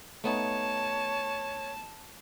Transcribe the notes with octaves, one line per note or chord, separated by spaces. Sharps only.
A3 B3 D#4 C#5 A5